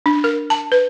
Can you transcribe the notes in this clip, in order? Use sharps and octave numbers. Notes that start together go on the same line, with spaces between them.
D4
A#4
A5
B4